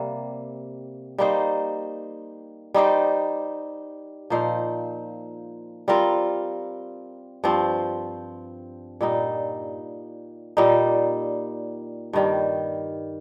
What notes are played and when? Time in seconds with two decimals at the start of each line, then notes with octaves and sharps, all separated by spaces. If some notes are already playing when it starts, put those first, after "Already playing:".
Already playing: C3 G3 A#3
1.18 G3 A#3 D#4 C5
2.74 G3 D#4 G4 C5
4.30 A#2 F3 D#4 C5
5.88 G3 C4 F4 A#4
7.44 G2 F3 C4
9.01 A#2 G3 D#4
10.57 A#2 G3 D#4
12.13 G2 D#3 G3